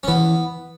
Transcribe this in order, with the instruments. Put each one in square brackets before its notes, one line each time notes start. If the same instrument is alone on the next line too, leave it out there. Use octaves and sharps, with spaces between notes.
[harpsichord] C#4
[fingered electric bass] E3 [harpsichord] B3